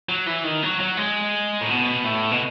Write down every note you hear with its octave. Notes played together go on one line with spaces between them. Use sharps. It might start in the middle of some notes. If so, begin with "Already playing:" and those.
F#3
E3
D#3
F#3
F#3
G#3
A2
B2
A2
B2